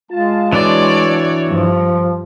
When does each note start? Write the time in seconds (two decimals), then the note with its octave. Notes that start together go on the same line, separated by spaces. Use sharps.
0.11 G#3 F4 A5
0.52 E3 D4 F#4 C#5 D5
1.46 G2 F3